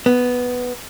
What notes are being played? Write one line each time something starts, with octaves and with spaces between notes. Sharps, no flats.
B3